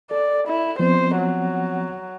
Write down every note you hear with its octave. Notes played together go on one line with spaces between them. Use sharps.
A4 D5
E4
F3 B3 C4 C5
F#3